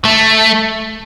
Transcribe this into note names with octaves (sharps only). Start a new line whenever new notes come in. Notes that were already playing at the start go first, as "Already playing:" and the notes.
A3